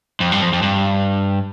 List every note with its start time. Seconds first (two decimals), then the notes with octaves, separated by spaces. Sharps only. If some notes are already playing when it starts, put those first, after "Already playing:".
0.20 F2
0.32 G2
0.42 F2
0.53 F2
0.62 G2